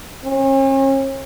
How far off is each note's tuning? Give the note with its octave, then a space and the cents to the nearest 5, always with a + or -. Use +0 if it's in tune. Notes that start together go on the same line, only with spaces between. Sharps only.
C#4 -40